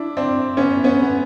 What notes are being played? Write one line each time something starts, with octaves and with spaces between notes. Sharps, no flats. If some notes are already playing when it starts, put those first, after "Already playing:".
Already playing: D4 E4
C4 D4
B3 C#4
B3 C#4
B3